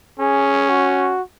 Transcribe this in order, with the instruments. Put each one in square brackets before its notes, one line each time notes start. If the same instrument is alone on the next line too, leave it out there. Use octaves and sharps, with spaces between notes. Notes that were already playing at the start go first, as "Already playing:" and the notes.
[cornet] C#4 [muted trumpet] G#4
[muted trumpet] F#4